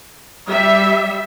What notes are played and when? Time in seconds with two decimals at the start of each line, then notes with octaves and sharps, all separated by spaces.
0.48 G3 E5